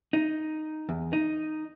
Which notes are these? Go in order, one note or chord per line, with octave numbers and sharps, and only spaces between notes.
D#4
E2
D#4